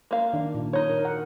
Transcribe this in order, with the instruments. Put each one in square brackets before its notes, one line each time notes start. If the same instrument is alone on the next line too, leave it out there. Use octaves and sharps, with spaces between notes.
[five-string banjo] A#3 F5
[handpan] D#3 D4
A#2
[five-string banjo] D#4 C#5
[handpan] A#4
F#5